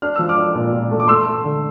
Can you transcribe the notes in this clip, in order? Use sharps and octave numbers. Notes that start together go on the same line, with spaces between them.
D4 F6
F3 E6
D6 F6
D4
A#2
A#2
A3
D6
A3 C6 E6
A3
D3